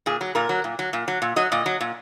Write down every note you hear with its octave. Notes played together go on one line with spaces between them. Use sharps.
A#2 G#4
F#3
A#2 A#4
F#3
A#2
F#3
A#2
F#3
A#2
F#3 D#5
A#2 D#5
F#3
A#2